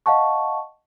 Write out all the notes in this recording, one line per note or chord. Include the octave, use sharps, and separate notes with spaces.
D#5 F5 F#5 A5 C#6